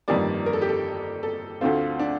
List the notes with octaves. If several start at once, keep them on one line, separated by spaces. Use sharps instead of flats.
G1 F2 D#3 G3 A#3 D5
A#4
A4
G4
A4
A4
D2 D3 A3 C4 F4
D4